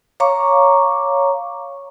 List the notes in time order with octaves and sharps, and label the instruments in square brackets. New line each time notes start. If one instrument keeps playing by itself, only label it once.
[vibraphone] C#5 F5 A#5 C#6 D6